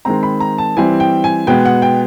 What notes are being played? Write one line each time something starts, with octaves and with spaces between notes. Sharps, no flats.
D#3 G#3 C4 A#5
B5
A#5
A5
E3 G3 C4 G#5
G5
G#5
B2 G#3 B3 G5
F#5
G5